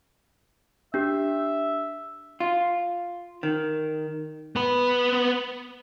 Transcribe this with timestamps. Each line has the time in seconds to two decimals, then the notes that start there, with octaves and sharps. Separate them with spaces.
0.94 D4 G4 E5
2.40 F4
3.43 D#3
4.56 B3 B4